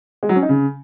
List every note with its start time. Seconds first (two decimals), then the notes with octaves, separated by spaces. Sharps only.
0.23 G#3
0.29 F#3
0.36 C#4
0.42 D#4
0.49 C#3